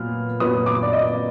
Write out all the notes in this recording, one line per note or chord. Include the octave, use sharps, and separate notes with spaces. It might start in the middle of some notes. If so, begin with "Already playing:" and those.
Already playing: A#2 F#3 B3 F6
A#2 F#3 B3 D#6
D6
D5
D#5